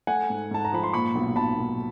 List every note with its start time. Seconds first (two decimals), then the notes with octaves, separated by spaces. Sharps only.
0.07 A3 F#5 G#5
0.30 G#2
0.51 G#2 A5
0.65 A#5
0.73 F3 B5
0.83 C6
0.93 A#2 B5 C#6
1.15 B1
1.36 B1 A5 B5
1.57 B1